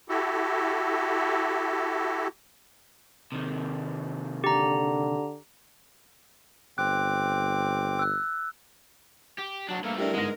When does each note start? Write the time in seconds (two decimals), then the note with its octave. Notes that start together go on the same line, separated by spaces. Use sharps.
0.09 E4 F#4 G4 A4
3.32 C3 D#3
4.44 D3 G4 A#5
6.78 G1 C4 D6 F#6
7.99 E6 F#6
9.39 G4
9.69 B1 F#3 D4
9.83 G2 A3 A#3
9.98 D4 E4 G4 A#4
10.14 G1 G#2 G#3 A#6